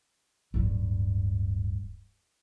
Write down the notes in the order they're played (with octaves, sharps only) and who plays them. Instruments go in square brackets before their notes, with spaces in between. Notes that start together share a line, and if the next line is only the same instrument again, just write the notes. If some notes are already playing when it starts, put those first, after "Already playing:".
[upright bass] D1 G2